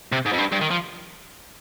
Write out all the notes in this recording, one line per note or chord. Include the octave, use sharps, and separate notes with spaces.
C3
G#2
F2
G2
G2
D#3
F3